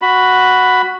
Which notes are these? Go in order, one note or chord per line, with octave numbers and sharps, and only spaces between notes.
F#4 B5